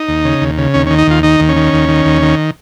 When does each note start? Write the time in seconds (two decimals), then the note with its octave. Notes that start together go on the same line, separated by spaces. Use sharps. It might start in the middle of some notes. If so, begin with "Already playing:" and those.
Already playing: D#4
0.08 D#2
0.25 C#3
0.42 D#2
0.58 C#3
0.74 D#2 C#4
0.86 C#4
0.90 D#3
0.98 D#4
1.07 D#2 F4
1.23 D#3 D#4
1.40 D#2
1.49 C#4
1.56 D#3
1.73 D#2
1.89 D#3
2.06 D#2
2.22 D#3